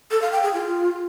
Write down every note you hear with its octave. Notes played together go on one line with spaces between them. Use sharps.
A4
F5
G5
G#4
F4